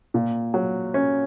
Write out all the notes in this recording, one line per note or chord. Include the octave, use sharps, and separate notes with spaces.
A#2
F#3
C#4